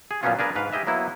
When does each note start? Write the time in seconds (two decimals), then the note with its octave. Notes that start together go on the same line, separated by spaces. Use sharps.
0.11 G#4
0.23 A#2 F3 F#3 B3 C#4 F4
0.39 D4 G#4 A#4 B4
0.55 G#2 B4 F5
0.73 G4 G#4 D#5 E5
0.87 F#3 A#3 B3 E4